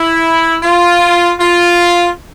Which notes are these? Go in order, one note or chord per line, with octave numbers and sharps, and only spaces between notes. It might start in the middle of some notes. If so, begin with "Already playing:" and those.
Already playing: E4
F4
F4